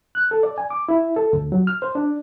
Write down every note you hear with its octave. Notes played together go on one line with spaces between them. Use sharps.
F#6
A4
D5
G#5
D6
E4
A4
D2
F#3
F6
C5
D4